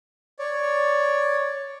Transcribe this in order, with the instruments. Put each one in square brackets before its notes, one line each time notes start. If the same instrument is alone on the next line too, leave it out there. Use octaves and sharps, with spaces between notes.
[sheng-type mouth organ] C#5 D5